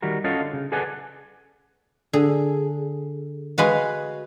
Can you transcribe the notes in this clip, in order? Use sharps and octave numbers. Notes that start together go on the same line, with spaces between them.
D#3 G3 F#4 A#4
C#4 F4 F#4 A4 D#5 F5
D3
C#3
G#4 A4 B4 D5 F#5 G#5
D3 G#4
G#3 F#4 B4 F5